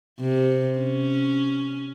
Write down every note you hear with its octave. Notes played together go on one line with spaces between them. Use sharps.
C3
C#4